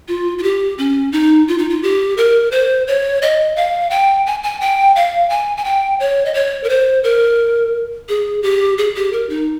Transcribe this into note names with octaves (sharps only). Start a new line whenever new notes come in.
F4
F4
G4
C#4
D#4
F4
D#4
F4
G4
A#4
C5
C#5
D#5
F5
G5
G#5
G#5
G5
F5
G#5
G#5
G5
C#5
D#5
C#5
A#4
C5
A#4
G#4
G4
G#4
G4
A#4
D#4